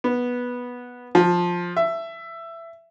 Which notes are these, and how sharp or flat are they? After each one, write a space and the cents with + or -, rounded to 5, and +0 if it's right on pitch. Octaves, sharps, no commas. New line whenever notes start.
B3 -10
F3 +10
E5 +15